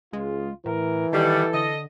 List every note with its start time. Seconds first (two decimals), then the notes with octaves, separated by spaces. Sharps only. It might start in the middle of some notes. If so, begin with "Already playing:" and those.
0.13 C#2 G#3 F4
0.66 A2 E3 A#4
1.13 B2 D#3 G3 A4
1.54 D3 D#5